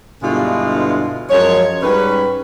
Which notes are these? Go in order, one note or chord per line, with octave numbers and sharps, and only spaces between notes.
G2 B2 D3 G#3 E4 F4
F#2 F3 G#3 C#5
G#2 G3 C#4 B4